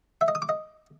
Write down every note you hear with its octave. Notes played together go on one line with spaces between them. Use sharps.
E5
D#5
D#6
D6
D#5